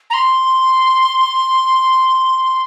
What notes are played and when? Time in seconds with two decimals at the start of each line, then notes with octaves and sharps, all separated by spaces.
0.10 A#5
0.14 C6